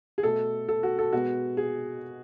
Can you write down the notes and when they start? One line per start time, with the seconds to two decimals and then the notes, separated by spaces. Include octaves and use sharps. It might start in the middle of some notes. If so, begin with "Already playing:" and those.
0.18 G#4
0.23 B2 A3 A4
0.69 A4
0.83 F#4
0.99 A4
1.13 B2 G#3 B3 F#4
1.57 G#4